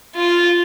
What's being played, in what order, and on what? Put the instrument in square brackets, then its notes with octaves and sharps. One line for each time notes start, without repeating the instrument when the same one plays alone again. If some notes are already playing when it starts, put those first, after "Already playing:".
[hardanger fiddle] F4